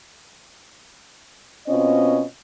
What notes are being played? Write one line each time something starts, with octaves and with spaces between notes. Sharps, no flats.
B2 C4 C#4 F4 D#5